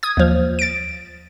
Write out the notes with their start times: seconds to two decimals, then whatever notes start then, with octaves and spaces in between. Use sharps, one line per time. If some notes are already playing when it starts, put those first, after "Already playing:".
0.03 D#6 G#6
0.17 D#2 F3
0.59 A6 D7